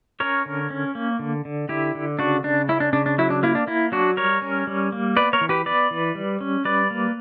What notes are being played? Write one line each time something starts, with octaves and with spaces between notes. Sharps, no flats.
C#4 A#4 C#5
D3
C#4
A#3
D3
D3
D3 E4 G4
D3
C#3 D4 F#4
C#3 D4
C#4 E4
D4
C#3 D4
D4
F#3 E4
D4
A#3 E4
D4
A#3 E4
F#3 D4 F#4
G3 A#4 C#5
C#4
G3
A#3
B3 B4 D5
A#4 C#5
E3
G4 B4
B3 B4 D5
E3
G3
C#4
G3 B4 D5
A#3